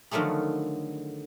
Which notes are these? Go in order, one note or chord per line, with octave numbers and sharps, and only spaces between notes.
D3 D#3 F3 F#3 A3 G#4